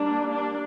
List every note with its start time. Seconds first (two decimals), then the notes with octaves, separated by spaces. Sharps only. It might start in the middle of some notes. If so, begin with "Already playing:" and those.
Already playing: G3 A#3 D4
0.30 D4